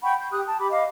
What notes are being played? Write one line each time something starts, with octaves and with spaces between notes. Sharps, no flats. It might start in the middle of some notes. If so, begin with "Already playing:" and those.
F#5 G5 B5 C#6
G6
G4 D#6 F#6
G5 A5
G4 B5 D6
D#5 F5 D6